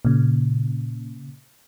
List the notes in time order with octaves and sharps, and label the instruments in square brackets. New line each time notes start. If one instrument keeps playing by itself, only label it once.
[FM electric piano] A#2 C#3